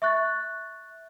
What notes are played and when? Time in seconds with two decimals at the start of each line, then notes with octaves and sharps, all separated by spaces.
0.02 E5 C#6 F#6 A6